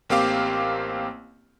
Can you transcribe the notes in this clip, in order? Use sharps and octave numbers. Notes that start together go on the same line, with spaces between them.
A1 A#3 C4 G4 F5 D6